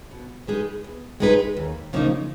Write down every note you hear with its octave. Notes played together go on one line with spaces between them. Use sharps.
B2
G#3 D#4 G#4 B4
B2
G#3 D#4 G#4 B4
D#2
C#3 F3 A#3 D#4